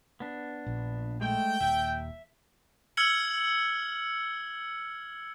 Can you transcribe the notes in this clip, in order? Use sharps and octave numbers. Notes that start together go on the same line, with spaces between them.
B3 D4
A#1
G#3 A3 G5
D#1 D#2 E5
E6 F6 G#6 C#7 F#7